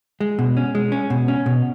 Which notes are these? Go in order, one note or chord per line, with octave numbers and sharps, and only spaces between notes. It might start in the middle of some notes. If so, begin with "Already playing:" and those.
G#3
B2
C#4
G#3
C#4
B2
C#4
B2